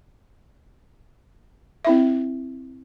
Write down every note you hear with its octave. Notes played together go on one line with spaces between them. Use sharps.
C4 E4 E5